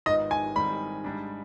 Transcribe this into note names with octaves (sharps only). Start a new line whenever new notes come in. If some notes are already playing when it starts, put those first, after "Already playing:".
G#1 G#2 D#3 B3 F4 D#5
G#5
G#2 D#3 G3 C4 B5
G#2 G3 D4